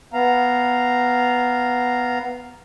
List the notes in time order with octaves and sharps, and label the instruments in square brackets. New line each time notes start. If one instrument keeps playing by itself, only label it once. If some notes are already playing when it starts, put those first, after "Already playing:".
[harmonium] B3 F5 A#5